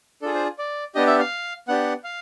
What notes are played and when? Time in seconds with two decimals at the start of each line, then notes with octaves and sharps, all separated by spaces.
0.22 D4 F4 G#4 A4
0.34 C5
0.59 D5
0.95 B3 D4 G4 D#5
1.07 E5
1.19 F5
1.68 B3 D4 G4 F#5
2.04 F5